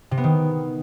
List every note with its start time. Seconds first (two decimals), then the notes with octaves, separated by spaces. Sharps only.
0.11 C3
0.18 B3
0.24 D#3